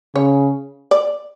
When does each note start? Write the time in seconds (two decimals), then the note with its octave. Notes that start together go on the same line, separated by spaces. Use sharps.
0.15 C#3 C#5
0.91 D5